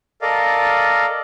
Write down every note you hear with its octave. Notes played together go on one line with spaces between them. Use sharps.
A4 A#4 D5 D#5 F5